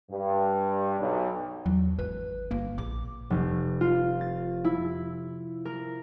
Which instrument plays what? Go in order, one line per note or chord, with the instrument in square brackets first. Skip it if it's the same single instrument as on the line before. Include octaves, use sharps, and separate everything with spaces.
[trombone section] G2
B1
[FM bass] E2 [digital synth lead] F#3
[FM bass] G#1 [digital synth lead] B4
[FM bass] G1 [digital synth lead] A#3
[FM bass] A#1 [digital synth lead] D6
[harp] F1
F4
A6
E4
A#4